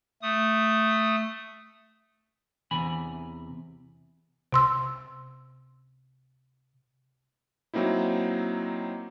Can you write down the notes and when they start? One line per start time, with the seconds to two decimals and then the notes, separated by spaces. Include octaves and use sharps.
0.22 A3 D#6
2.71 E2 C3 E3 G#5 B5
4.52 C3 C6 E6
7.74 F#3 A#3 C4 D#4 E4